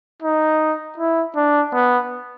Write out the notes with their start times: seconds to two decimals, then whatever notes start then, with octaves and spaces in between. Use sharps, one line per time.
0.22 D#4
0.98 E4
1.36 D4
1.73 B3